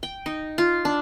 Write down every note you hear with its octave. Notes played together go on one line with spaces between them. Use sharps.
G5
D#4
F4
D4